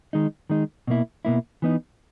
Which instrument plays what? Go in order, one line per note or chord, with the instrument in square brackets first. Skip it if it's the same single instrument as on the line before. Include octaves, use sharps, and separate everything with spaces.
[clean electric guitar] D#3 G#3 D#4
D#3 G#3 D#4
B2 A#3 E4
B2 A#3 E4
E3 B3 D#4